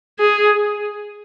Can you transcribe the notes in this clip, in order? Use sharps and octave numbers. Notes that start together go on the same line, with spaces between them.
G#4